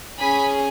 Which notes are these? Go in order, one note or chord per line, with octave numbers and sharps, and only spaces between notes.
C#4 G#4 G#5 B5